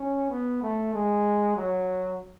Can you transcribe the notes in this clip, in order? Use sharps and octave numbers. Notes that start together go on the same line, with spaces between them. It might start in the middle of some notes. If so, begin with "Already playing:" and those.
Already playing: C#4
B3
A3
G#3
F#3